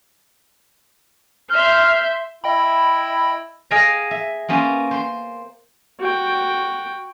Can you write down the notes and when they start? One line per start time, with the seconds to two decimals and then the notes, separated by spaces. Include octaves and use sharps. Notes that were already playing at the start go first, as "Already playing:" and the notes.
1.50 E5 C6 F6 G6
2.44 E4 D#5 G5 B5
3.71 G#4 D#5 F5 G5 G#5 A#5
4.11 E5
4.49 A#3 B3 C#4 C5 A5
4.91 C5 C6
6.00 F#4 G5